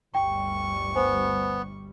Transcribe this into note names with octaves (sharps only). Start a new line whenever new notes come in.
G1 D2 G3 G5 C#6
B3 C5 G#5